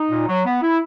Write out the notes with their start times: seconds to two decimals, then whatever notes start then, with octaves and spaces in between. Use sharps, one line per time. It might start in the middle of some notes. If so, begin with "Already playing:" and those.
Already playing: D#4
0.10 A#2
0.27 F#3
0.45 B3
0.62 E4